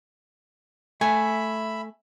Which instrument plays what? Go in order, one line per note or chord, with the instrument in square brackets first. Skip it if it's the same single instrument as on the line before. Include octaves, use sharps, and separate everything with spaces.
[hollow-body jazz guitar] A3 [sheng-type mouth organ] E5 B5 [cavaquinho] G#5